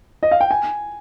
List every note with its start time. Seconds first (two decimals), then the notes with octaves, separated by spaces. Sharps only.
0.23 D#5
0.31 F5
0.41 G5
0.51 G#5